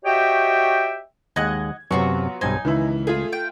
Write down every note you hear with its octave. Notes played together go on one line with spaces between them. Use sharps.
F#4 G4 C#5 D#5 E5 G5
D#2 G#3 D#5 F#5 F#6 G#6
F#2 C3 F#3 B3 F4 F#4 C#6
B1 G2 D#4 C5 G#5
C#2 D#3 E3 E4
A3 F4 G#4
G5